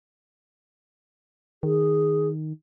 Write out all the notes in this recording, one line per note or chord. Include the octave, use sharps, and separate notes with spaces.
D#3 G#4